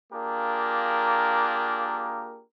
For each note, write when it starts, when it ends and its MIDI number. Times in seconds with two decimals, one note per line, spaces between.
0.13 2.42 58
0.13 2.42 62
0.13 2.42 65
0.13 2.42 67
0.13 2.42 68
0.13 2.42 70